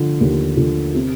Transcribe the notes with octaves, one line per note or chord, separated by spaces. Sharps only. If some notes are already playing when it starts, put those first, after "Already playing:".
Already playing: D3 F3
D#2
D3 F3
C3